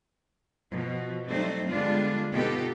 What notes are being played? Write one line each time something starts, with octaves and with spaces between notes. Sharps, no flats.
B2 F3
F#3 G3 A3 C4 D#4 C5
D3 G3 G#3 B3 D4 F4
B2 B3 D#4 F4 G4 A4